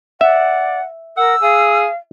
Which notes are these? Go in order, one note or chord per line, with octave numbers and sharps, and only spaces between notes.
D5 E5 F#5
A#4 F#5 E6
G#4 F5